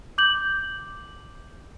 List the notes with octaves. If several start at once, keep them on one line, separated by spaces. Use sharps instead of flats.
D6 G6 F#7